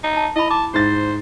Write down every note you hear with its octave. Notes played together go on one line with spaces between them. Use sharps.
D#4
A5
E4 D#5 B5
A5 D6
G#2 C5 A6